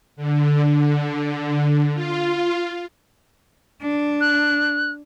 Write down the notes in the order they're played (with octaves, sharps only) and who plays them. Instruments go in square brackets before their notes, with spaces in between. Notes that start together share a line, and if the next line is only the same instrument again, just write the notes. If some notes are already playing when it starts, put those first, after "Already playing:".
[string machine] D3
F4
[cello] D4
[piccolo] F#6